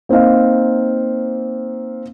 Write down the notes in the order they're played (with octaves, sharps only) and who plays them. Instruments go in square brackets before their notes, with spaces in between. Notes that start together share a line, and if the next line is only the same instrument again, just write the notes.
[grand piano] A#3 C4 D#4 F5